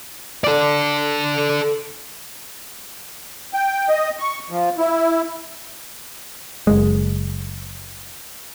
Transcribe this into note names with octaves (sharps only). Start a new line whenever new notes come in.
A4 D5
G5
D#5
C#6
F3
E4
F#1 G#3